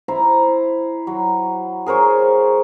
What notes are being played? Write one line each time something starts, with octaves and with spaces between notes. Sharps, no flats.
E4 C5 A#5
F#3
G#4 A#4 C5 C#5